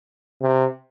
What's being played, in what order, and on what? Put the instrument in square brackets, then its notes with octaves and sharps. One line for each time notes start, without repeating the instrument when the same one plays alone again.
[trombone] C3